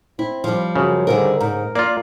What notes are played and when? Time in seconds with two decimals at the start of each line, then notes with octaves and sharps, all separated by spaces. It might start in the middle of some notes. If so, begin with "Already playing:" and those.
0.19 C4 E4
0.44 F3 G3
0.76 F#2 C#3
1.07 G#2 D3 G3 A#4
1.40 G#2 A#4
1.75 A#3 F4 D5